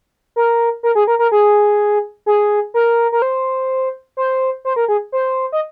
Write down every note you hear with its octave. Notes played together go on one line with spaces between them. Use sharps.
A#4
A#4
G#4
A#4
A#4
G#4
G#4
A#4
A#4
C5
C5
C5
A#4
G#4
C5
D#5